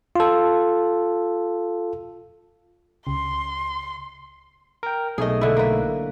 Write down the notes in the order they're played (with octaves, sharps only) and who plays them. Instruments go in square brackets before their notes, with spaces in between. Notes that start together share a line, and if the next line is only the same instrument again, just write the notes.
[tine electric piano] F4 A4
[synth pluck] C#2 C#3 [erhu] C6
[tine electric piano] A#4 G5
[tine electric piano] B1 A3 [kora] G#4 D#5
[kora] D3 E4
A#3 B4